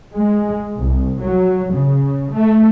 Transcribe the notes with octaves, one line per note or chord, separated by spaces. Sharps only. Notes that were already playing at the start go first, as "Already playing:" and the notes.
G#3
C2
F#3
C#3
A3